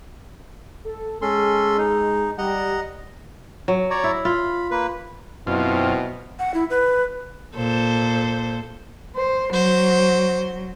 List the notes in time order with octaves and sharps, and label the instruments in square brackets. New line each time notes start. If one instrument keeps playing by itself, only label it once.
[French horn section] A4
[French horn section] G#3 [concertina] C#4 A4 C6
[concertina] D#4
[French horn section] G3 [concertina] D#5 F#5 A#5
[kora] F#3
[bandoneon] C#5 D5 A#5
[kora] E4
[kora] F4 [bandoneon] B5
[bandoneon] A#3 B4
[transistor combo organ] F#2 F4 [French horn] B2 [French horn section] C4 E4
[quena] F#5
E4
B4
[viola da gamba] A#2 A4 C5
[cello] C5
[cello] F#3 [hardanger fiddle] C5